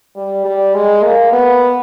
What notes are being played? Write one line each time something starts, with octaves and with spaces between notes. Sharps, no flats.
G3
G3
G#3
A#3
B3